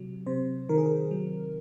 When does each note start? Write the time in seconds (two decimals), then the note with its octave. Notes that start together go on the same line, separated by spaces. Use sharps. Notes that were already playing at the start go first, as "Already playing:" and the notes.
Already playing: C3 F#3
0.26 C3 C5
0.69 D#3 A#4
0.78 G#4
0.86 A#4
1.11 F#3